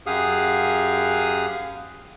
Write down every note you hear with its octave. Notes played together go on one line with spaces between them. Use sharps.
F#2 G4 G#4 F5 F#5 D#6